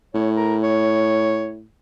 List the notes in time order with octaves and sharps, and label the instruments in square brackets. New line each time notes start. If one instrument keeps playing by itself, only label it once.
[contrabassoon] A2 [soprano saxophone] C#5
[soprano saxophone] A#4
C#5